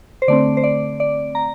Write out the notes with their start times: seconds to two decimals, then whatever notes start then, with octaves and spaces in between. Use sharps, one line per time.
0.22 C5
0.28 D3 A3 C4 D5
0.57 C5
0.64 D5
1.00 D5
1.35 A#5